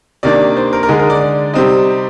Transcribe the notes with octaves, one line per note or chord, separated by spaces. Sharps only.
C3 D#3 A#3 D4 D5
C5
A#4
A#4
D3 G#3 D#4 G#4
A#4
D5
D5
C3 G3 C4 D#4